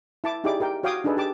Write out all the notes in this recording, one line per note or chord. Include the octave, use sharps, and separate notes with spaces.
E4 A5 D6
D#4 E4 G4 G#4 D5 D6
G4 A#4 G5
F#4 C#5 F5 G5 D6 D#6
D4 D#4 G#4 A4 B4
G4 A5 D6